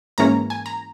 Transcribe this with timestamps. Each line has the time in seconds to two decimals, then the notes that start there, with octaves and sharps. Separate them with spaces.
0.18 G#2 E3 A#3 C#4 A#5
0.50 G#5
0.66 A#5